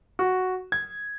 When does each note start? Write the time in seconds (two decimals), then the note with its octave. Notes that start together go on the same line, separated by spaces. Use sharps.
0.19 F#4
0.72 G#6